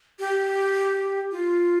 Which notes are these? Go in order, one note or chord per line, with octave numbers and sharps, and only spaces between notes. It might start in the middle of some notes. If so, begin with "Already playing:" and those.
G4
F4